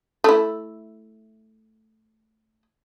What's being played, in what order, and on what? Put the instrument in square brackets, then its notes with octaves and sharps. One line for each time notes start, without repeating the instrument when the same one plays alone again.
[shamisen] A3 E4